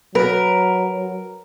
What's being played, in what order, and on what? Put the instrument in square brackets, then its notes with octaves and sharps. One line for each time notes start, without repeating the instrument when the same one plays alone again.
[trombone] F#3 [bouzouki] A#4 [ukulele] B4